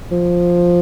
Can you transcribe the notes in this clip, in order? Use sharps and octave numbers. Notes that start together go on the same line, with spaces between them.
F3